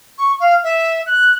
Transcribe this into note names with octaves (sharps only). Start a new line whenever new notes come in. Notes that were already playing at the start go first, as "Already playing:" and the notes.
C#6
F5
E5
F#6